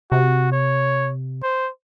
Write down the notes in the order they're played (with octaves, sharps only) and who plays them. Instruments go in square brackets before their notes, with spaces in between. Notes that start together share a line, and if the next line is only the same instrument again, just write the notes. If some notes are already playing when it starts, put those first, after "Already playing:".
[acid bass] C3 [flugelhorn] F#4
[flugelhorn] C#5
C5